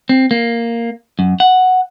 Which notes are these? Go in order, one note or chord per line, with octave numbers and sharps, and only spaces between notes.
C4
A#3
F#2
F#5